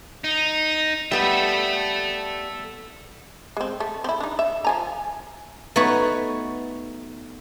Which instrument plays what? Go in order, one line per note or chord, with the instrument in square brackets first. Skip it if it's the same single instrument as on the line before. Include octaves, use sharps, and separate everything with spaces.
[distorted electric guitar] D#4
[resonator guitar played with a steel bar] G3 B3 [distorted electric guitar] A4 E5
[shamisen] G#3 C4
A3
C4 E4
D4 D#4
E5
F3 G#5 A#5
[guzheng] A3 B3 D#4 F#4 B4 C#5